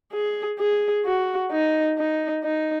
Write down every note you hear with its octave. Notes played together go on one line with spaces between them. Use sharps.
G#4
G#4
F#4
D#4
D#4
D#4